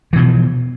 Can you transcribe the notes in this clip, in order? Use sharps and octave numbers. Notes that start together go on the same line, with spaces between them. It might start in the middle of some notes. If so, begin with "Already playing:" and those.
B2 E3 F3